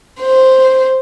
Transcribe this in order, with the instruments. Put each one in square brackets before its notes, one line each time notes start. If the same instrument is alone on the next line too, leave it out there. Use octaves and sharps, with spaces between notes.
[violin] C5